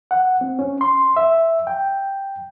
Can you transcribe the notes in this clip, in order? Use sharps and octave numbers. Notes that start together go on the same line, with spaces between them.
F#5
C4
C#4
C6
E5
G5